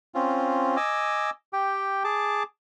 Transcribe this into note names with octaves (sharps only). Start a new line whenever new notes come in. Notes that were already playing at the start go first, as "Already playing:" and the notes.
C4 C#4 F4
D#5 G#5 D6 E6
G4 G5
G#4 A5 D6